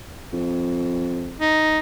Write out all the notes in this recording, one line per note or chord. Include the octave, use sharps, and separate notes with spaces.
F2
D#4